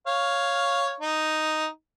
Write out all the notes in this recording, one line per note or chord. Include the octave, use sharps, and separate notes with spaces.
C#5 F5
D#4